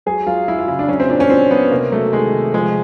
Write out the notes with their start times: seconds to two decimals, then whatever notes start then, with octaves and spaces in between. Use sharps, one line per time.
0.06 F#3 G#4
0.27 F#3 F4
0.48 F#3 E4
0.58 F4
0.68 C#3 E4
0.79 D4
0.89 F#3 C#4
1.00 C4
1.10 A#2 D4
1.20 C#4
1.30 A#2 C4
1.50 F#3 B3
1.71 C3 A#3
1.91 F#3 A3
2.12 D#3 G#3
2.33 C3
2.53 F3 G#3